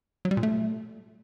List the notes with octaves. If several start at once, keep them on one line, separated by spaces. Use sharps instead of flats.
F#3
G3
A#2
A3